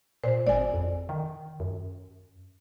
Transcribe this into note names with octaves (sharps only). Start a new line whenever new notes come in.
A#2 C5
G#1 D5 G#5
F2
D#3
F#2